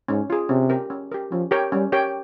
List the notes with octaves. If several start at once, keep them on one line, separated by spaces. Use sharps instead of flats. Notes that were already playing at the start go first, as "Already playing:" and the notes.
G#2 C#4
F4 G#4
C3 C#4
G4 A#4
C#4
G4 A#4
F3 C#4
G4 A#4 C#5 G5
G3 C#4
G4 A#4 C#5 G5